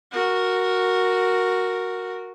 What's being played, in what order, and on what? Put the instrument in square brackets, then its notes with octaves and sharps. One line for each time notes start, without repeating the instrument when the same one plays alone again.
[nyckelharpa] F#4 A#4